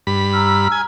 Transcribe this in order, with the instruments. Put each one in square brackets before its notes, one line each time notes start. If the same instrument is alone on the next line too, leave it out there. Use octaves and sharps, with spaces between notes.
[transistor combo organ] G2 B5
[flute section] A#5 E6 F6
[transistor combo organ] G#5